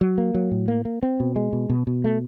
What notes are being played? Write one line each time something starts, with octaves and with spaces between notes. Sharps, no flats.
F#3
A#3
F#3
A2
A#3
A#3
C4
B2
G#3
B2
B2
B2
A3